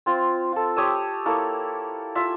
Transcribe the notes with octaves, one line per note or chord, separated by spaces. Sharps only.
C4 F4
F4 A4
G4 C#5 D#6 E6
A#3 E4 A4 C#5
F4 E5